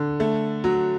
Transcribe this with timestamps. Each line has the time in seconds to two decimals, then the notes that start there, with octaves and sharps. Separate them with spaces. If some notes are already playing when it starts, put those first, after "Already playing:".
Already playing: D3
0.20 A3
0.64 F#3